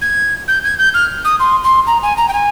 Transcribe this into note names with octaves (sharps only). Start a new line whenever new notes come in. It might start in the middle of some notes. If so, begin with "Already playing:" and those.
G#6
G6
G#6
G6
F6
D#6
C6
C6
A#5
G#5
A#5
G5
G#5